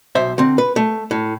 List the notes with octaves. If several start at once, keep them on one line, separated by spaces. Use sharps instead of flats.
B1 C5 E5
D3 C4
B4
A3
A2